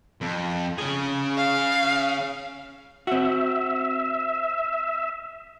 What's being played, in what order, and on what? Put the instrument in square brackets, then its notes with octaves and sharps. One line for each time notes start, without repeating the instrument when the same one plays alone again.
[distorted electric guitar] F2
C#3 G#4
[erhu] F5
[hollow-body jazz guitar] C4 F#4 [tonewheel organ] E5